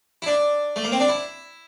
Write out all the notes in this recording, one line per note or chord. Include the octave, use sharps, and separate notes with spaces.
E4
D4
A3
A#3
C4
D4
E4